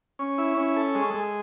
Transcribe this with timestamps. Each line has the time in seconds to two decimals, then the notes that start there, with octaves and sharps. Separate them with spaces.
0.19 C#4
0.38 E4
0.57 C#4
0.76 A4
0.95 G#3
1.14 G#3